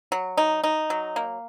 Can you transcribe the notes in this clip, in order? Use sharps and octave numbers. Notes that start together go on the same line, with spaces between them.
F#3
D#4
D#4
F#3
A#3